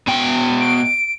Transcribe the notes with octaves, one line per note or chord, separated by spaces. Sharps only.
B2 G5
D7